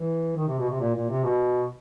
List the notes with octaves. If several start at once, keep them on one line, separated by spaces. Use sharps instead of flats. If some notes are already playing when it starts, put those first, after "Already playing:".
Already playing: E3
D#3
C3
B2
C3
A#2
A#2
C3
B2